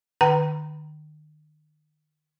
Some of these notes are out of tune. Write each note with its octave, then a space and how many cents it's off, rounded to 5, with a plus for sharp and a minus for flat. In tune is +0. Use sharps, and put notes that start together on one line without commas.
D#3 -35 G5 -30 A#5 +0